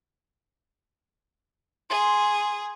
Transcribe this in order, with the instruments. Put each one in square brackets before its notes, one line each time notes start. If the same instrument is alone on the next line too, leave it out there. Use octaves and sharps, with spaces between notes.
[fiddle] G#4 [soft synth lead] C6